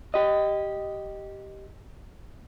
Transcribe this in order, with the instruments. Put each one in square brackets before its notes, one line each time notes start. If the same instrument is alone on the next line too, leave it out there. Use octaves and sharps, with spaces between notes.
[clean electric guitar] G4 D#5